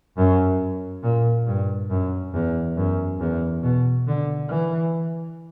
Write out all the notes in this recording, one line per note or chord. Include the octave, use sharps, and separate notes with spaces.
F#2
A#2
G2
F#2
E2
F#2
E2
B2
D3
E3